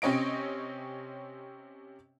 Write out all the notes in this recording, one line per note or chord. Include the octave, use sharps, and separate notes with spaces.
C3 C4 C#4 C#5 D#5 D7